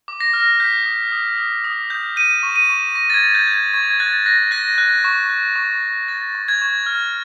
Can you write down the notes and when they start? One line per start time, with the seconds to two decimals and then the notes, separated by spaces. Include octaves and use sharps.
0.08 D6
0.21 A#6
0.33 F6
0.40 A#6
0.60 G6 B6
0.85 D#6
1.12 D#6
1.38 D#6
1.64 D#6
1.90 G6
2.16 G6 D#7
2.43 C#6
2.56 D#7
2.69 C#6
2.95 C#6 A#6
3.10 A6
3.14 G#6
3.22 G6
3.35 G6
3.47 G6
3.54 G#6
3.74 C#6 G#6
3.90 G#6
4.00 F#6 A6
4.26 F#6 A#6
4.51 F#6 A#6
4.78 F#6
5.04 C#6
5.30 F#6
5.56 C#6
5.82 F#6
6.08 F#6 A6
6.35 C#6
6.48 G#6
6.61 C#6
6.86 F6